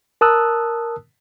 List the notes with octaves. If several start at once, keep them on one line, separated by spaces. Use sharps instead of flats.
A#4 A5 D#6 E6 F#6